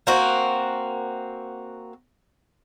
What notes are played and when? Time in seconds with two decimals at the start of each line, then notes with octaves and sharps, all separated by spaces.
0.07 A#3 C4 F#4